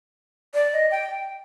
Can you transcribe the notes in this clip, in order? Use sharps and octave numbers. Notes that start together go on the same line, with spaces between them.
D5
D#5
G5